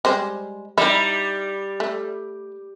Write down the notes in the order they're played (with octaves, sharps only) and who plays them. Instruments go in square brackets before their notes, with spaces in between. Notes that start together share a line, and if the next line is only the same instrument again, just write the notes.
[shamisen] G3 G#3 C5
[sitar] G3 [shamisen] D#4 E4
[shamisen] A3